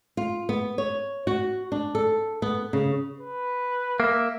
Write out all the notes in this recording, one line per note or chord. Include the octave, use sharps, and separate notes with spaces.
F4
B3
C#5
F#4
D4
A4
B3
C#3
B4
A#3 E5